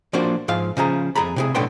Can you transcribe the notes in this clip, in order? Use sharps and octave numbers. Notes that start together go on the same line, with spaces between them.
F3 A#3 D4 F#4 C5
G#2 F3 F5
C#3 F3 G#4 A#5
F2 G#4 A#5 B5
C3 E4 G#4
B1 A2 D3 B3 G5 C6